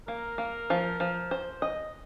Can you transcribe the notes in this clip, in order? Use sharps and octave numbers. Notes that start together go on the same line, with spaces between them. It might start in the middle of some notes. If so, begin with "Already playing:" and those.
A#3 A#4
A#3
F3
F3
C5
D#5